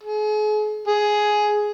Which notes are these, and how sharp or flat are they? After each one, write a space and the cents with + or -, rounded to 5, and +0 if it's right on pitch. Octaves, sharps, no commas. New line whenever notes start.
G#4 +40
G#4 +10